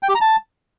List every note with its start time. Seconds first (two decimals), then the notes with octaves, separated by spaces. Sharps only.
0.03 G5
0.09 G4
0.15 A#5
0.21 A5